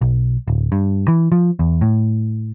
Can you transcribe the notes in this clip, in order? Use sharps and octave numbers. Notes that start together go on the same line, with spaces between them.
B1
D1
G2
E3
F3
E2
A2